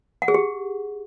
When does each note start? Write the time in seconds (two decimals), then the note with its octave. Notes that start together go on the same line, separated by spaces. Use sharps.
0.22 F#5
0.28 G#4
0.34 G4